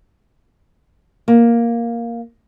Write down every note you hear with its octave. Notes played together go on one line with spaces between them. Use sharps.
A#3